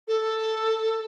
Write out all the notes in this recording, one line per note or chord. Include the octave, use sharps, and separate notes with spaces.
A4